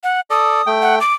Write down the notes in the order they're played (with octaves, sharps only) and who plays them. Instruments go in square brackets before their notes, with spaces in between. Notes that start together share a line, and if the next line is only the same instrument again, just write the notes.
[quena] F#5
[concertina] A4 D5 [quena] D#6
[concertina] A3 G5
[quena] F#5
D6